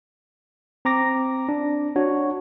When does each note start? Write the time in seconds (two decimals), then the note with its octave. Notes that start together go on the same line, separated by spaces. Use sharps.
0.85 C4 A#5 D6 A#6
1.49 D4
1.96 D4 F#4 C#5